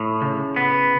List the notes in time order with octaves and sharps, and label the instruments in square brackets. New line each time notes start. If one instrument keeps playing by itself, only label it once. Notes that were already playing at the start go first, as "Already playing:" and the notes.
Already playing: [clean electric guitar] A2
C#3
B3